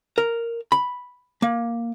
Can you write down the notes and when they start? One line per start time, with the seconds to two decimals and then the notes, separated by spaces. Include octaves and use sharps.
0.18 A#4
0.72 B5
1.42 A#3